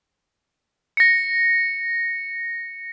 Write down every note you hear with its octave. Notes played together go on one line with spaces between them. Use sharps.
A#6 C#7